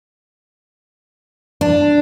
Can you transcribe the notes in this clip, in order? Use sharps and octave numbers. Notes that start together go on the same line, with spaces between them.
D4